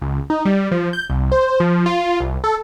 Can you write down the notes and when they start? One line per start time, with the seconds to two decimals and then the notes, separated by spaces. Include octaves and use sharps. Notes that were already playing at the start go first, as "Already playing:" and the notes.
0.01 C#2
0.30 D#4
0.45 G3
0.71 F3
0.93 G6
1.10 C2
1.32 C5
1.60 F3
1.86 F4
2.20 C2
2.44 A4